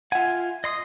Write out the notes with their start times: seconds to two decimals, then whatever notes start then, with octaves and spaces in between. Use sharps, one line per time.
0.12 F4 E5 F#5 G#5
0.64 D#5 C6 D#6